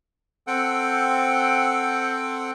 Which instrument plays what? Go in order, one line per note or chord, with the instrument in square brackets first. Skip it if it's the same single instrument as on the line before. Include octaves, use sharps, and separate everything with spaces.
[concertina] C4 A4 F#5 G5